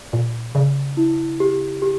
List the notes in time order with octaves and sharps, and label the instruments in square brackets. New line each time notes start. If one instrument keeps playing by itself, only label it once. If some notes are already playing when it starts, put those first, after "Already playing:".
Already playing: [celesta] D5
[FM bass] A#2 [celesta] D5
[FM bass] C#3 [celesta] D5
[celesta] E4
G4
G4